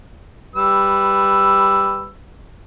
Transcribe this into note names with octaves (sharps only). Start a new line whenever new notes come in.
G3 B4 E6